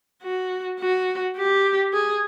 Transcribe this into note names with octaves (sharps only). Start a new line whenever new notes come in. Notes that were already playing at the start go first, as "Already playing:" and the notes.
F#4
F#4
G4
G#4